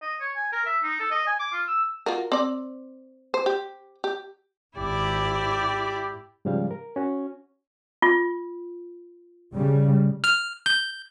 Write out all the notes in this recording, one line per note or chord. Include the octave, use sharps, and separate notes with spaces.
D#5
C#5
G#5
A#4
E5
D#4
A4
D#5
G#5
D6
F4
E6
F4 F#4 A#4
C4 D5
C5
G4
G4
G#1 E4 G4 D5
G4
G#2 C#3 F3 G3 F5
A#4
C#4 F#4
F4
C#3 G3
F6
G6